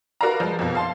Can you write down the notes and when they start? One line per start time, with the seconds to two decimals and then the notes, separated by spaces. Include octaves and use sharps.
0.21 F#4 A#4 B4 D5 F5 A#5
0.40 F3 G#3
0.59 F2 B2
0.75 F5 A5 C6